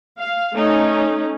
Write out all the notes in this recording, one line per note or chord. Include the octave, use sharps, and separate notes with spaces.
F5
A3 C#4 D#4